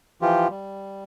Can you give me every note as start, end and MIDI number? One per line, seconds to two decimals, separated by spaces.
0.22 0.48 52
0.22 0.48 53
0.22 0.48 65
0.22 0.48 67
0.50 1.04 55